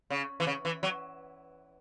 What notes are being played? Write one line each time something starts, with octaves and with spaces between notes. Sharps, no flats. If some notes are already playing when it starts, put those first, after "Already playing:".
C#3
E3
C#3
E3
F#3